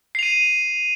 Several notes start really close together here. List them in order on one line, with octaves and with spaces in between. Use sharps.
C7 F7 D#7